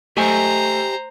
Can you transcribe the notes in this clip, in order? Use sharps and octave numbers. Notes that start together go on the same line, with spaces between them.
A3 G4 C5 D#5 G#5 A#5